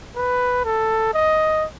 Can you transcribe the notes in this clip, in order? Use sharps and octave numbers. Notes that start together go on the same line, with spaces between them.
B4
A4
D#5